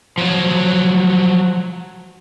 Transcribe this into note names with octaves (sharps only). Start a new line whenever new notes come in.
F3 F#3